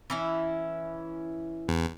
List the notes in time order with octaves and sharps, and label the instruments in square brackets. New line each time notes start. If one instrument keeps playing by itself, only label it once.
[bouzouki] E3 C#4 E4
[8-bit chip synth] E2